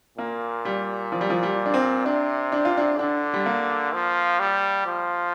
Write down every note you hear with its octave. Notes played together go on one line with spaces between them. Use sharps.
A#2 A#3
G3
F3
G3
F3
G3
D4
C4
C3 D4
D4
F4
D4
D3 D4
G3
A#3
F3
G3
F3